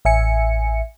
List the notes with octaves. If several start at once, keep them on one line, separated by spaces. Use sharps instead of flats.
A1 E5 G#5 C#7